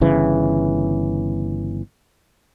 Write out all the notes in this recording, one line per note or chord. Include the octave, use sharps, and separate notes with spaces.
G1 C#3 E3